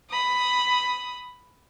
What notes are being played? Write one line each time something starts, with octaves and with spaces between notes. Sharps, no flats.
B5 D#6